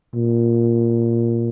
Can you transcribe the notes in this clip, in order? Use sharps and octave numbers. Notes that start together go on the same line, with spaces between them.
A#2